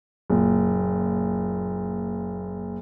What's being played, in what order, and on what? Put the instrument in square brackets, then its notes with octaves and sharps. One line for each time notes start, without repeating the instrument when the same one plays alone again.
[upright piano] F#1 A#2